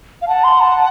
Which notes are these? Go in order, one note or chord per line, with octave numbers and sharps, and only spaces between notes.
F5
F#5 A5
C6
A5